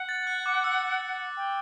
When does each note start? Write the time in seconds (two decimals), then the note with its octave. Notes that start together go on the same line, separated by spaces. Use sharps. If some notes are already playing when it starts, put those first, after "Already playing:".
Already playing: F#5
0.09 A6
0.27 F#6
0.46 D6
0.64 E6
1.37 G5